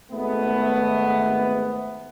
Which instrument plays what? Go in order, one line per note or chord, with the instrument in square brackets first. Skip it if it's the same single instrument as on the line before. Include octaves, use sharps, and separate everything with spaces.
[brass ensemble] G#1 A3 B3